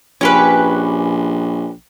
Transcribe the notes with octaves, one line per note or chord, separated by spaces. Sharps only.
A#1 C#4 G4 B4